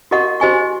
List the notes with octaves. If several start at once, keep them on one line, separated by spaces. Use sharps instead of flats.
F#4 A#4 D#5 F#5 C#6
F#4 C5 D#5 G#5 C#6